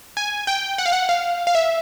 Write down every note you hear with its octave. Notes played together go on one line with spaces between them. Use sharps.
G#5
G5
F#5
F5
F#5
F5
F5
E5